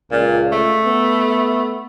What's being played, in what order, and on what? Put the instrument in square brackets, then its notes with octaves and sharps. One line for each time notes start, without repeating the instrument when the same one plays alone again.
[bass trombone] C#2 [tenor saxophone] A#2
[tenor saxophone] A3
[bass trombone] B3